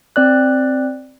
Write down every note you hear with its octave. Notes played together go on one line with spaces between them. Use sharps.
C4 D5 F#6